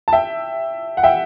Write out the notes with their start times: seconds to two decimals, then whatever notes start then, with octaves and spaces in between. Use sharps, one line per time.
0.08 A5
0.13 E5 G5
0.97 F#5
1.03 E5 G5